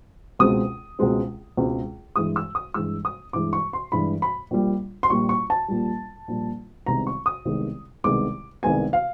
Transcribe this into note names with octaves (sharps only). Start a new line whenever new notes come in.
C#2 B2 G#3 C4 D#6
C#2 B2 G#3 C4
C#2 B2 G#3 C4
G2 E3 G#3 D#6
E6
D#6
G2 E3 G#3 E6
D#6
G2 E3 G#3 D6
C#6
C6
G2 E3 G#3 B5
B5
A#1 A#2 G3
C6
A#1 A#2 G3 C#6
C#6
A5
A#1 A#2 G3
A#1 A#2 G3
C2 C3 D#3 G#3 B3 A#5
C#6
D#6
C2 C3 D#3 G#3 B3
C2 C3 D#3 G#3 B3 D6
C2 C3 D#3 G#3 B3 G#5
F5